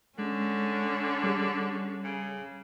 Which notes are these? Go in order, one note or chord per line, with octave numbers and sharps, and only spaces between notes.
D3 G#3 C#4
G3 G#4
C#3